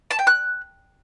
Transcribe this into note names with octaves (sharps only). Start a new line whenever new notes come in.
A5
G5
F#6